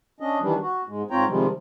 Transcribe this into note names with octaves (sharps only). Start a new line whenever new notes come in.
C#4 D4 D#5
D#3 E3 G3 D4
F#4
G#2 G#3
G#2 C4 F4 C#5 G5 A#5
C3 D#3 F3 G3 G#3